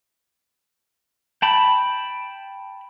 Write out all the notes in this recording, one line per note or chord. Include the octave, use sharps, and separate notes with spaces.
G5 A5 B5